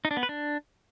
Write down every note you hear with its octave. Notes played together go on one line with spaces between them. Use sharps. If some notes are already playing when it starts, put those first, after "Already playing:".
D#4
D4
B3
B4
D4